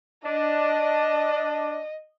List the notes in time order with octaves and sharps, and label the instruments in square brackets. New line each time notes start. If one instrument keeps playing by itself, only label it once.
[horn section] D4 [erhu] D#5